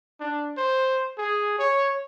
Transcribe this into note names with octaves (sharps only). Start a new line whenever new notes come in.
D4
C5
G#4
C#5